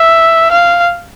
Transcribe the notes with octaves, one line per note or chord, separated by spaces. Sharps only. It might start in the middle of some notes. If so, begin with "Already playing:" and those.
Already playing: E5
F5